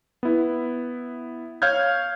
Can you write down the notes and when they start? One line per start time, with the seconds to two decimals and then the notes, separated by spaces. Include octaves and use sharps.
0.23 B3 E4
1.62 C#5 F5 F6 G6 G#6